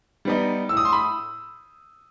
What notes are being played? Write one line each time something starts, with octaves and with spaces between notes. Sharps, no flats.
G3 B3 D#4
A2 E6
D#6
C6
B5 D#6